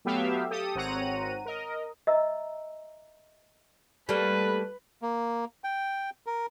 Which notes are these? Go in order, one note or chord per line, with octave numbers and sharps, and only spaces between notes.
F#3 A3 B3 G4 E5 F5
G4 A4 D#6
G#1 C4 C#5 F#5 A#5 D#7
A#4 D#5
D#5 E5 A#5 E6
G3 A3 A#3 B4
A#3
G5
A#4